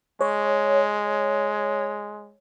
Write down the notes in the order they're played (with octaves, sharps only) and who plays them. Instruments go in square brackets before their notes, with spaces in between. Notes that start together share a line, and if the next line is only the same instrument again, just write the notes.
[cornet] G#3 [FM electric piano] C#5